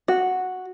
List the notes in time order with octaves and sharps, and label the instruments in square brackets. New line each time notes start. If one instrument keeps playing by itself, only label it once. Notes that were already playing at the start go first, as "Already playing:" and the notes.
[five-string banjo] F#4